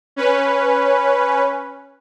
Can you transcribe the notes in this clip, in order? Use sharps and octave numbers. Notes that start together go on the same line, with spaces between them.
C#4 B4